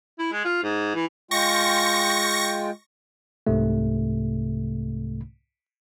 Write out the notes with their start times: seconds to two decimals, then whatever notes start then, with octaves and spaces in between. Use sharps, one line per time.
0.19 E4
0.32 G#3
0.44 F4
0.63 G#2
0.95 E3
1.31 G#3 F4 G5 C#6 A#6
3.47 C2 G#2 C3 A3